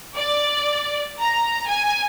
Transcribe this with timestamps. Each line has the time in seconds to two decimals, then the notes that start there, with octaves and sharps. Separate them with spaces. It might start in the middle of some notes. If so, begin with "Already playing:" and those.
0.16 D5
1.21 A#5
1.67 G#5